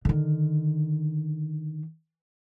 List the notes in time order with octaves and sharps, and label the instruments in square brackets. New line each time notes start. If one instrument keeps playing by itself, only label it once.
[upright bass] D3 D#3